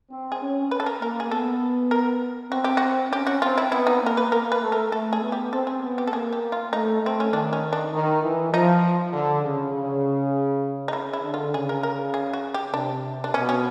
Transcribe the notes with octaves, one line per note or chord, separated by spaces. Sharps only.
C4
G#4
C#4
B4
A4
A#4
A#3 A#4
G#4
B3 A4
A#4
C4 F#4
G4
F#4
C#4 G4
F#4
C4 F4
E4
B3 E4
D#4
A#3 A#4
B4
A#3 A#4
B4
A3
A#4
A3 A4
G#4
B3
G4
C4 A4
G#4
B3
G4
A4
A#3 G#4
G4
F4
A3 D#4
A3 C4
C#4
D#3 D4
C#4
D4
D#3
E3
F3 D#4
D3
C#3
C#3
D#4
C#3 E4
E4
D3
F4
C#3 G#4
A#4
A#4
G#4
F#4
G4
C3 D4
D4
B2 C#4
C#4